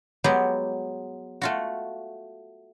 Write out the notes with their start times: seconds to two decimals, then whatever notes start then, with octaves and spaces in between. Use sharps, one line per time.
0.24 F#3 G#3 B3 G4
1.42 A3 F4 F#4